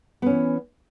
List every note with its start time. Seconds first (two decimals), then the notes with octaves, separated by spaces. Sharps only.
0.22 B3
0.26 C#4
0.30 E3